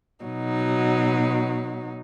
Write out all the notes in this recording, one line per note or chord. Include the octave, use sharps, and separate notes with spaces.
B2 F#3 D#4